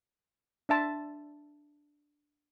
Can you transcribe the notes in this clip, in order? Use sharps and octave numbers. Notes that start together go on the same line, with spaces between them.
D4 E5 A5 C6